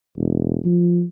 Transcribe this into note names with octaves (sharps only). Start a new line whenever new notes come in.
E1
F3